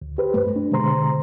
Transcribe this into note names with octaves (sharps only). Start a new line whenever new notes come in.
D2
G4 B4 C5
G2 A3
D4
B2 D3 G#3 C5 A#5 C6